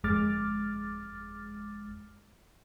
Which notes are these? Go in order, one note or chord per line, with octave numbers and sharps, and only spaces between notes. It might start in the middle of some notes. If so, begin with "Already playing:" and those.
G1 F2 G#3 D6 F6 A6